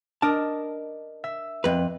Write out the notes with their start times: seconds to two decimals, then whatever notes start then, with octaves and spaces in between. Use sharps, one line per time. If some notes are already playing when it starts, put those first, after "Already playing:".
0.22 D4 A#4 D#5 A5
1.24 E5
1.64 F2 B4